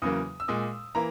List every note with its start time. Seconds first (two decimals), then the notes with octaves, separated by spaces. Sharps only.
0.02 E2 C#3 F#3 A#3 D#6
0.40 E6
0.48 A#2 G#3 D#6
0.95 E3 A#3 A#5